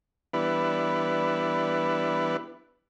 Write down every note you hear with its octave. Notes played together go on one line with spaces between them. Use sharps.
E3 G3 B3 D4 E4 B4